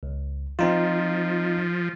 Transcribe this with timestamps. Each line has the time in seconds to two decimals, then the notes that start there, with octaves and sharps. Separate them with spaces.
0.03 C#2
0.59 F3 C4 D#4 F4